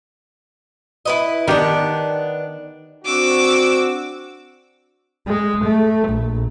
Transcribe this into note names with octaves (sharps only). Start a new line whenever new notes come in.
E4 B4 D#5
D#3 B3 D4 G4
C4 D4 F#4 D6 E6
G#3
A3
A#1